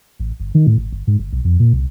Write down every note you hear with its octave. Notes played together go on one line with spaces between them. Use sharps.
A1
G1
D#3
A2
G#1
G1
G#2
G1
B1
F2
A#2
C2